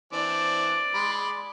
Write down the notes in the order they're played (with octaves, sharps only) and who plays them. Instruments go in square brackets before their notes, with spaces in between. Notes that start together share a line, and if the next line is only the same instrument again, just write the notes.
[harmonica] E3 C4 D4 [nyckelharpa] D5
[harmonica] G#3 B5 C6